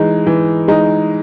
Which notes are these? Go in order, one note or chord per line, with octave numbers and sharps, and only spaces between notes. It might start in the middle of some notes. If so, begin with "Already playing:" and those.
Already playing: E3 G#3 D#4
E3
G#3 D#4